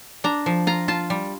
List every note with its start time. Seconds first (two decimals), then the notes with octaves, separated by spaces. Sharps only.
0.24 D4 A#5
0.46 F3
0.67 F4 A#5
0.88 F4 A5
1.10 G3